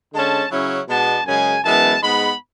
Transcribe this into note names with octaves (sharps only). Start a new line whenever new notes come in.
D3 G#3 C#4 A5
C#3 F#3 C#4 E4
B2 G#3 B3 D4 A5
F#2 C#3 G#3 G#5
F#2 E3 G#3 B3 A5
G#2 G#3 B3 B5